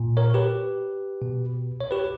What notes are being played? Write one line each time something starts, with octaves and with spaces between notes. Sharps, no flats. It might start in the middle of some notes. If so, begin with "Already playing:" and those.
Already playing: A#2
A#4 C#5
G4 B4
B2
C#5
G4 B4